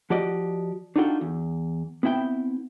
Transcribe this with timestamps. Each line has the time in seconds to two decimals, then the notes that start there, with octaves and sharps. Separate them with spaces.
0.10 F3 F#4 G4 D5 D#5
0.96 D4 D#4 F4 F#4 A4 G5
1.21 E2
2.03 B3 C4 E4 E5 G5